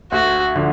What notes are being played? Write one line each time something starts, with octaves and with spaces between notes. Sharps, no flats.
D2 F#4
D3 F3